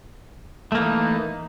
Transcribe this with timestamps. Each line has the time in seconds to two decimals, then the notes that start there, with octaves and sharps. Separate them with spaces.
0.72 A3
0.75 A#3
0.78 E3
0.81 D#4